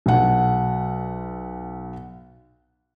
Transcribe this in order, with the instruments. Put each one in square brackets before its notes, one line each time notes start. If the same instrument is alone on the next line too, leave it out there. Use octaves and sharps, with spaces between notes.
[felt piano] B1 F#5